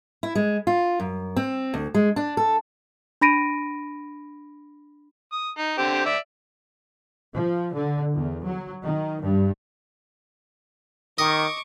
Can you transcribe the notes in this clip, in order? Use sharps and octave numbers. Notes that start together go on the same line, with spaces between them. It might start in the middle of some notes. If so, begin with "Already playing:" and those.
E4
G#3
F4
F#2
C4
D2
G#3
D4
A4
D4 B5 A#6 D7 D#7
D#6
D#4
D3 C4 G4
D5 E5
F3
D3
E2
F#3
D#3
G2
D#3 D#5 C#6 D6